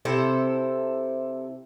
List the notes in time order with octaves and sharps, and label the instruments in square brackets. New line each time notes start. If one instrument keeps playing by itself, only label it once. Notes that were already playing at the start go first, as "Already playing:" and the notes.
[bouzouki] C3 E4 A4 C5